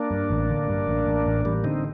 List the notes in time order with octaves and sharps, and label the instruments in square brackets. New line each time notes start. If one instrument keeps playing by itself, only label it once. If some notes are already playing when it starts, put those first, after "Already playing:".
Already playing: [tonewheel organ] A#3 D4
[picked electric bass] G2
A1
D3
G2
A1
A1
A1
[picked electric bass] A1 [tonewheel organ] G3 A#3
[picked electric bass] D3 [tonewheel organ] C4 D#4